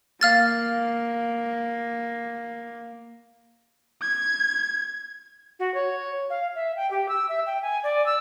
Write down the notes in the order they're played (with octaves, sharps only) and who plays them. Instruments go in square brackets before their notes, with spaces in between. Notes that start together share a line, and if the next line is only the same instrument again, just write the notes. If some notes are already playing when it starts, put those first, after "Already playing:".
[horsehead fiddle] A#3 [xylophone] F5 F6 A6
[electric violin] G#6
[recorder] F#4
C#5
F5
E5
G5
G4
E6
E5
G5
G#5
D5
E6